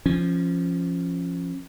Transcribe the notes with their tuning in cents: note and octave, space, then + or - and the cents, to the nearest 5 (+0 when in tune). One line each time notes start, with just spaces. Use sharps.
F3 -15 C#4 -25